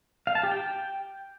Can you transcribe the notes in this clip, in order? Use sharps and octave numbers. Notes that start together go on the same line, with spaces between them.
F5
A5
G4
G5